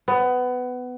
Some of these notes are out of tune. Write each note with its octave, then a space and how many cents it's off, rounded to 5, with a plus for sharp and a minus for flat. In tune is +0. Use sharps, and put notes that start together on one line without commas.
B3 +20